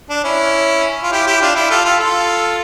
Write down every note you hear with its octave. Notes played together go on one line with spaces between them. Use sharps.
D4
C#4 E4
F4
E4 G4
E4 G4
D4 F4
E4 G4
F4 A4
F4 A4
F4 A4